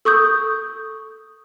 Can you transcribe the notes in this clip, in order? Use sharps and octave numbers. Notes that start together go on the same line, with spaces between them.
A4 C#6 D#6 G6